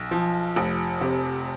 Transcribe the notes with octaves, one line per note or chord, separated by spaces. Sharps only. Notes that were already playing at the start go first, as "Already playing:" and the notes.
Already playing: B1
F3
F1
C3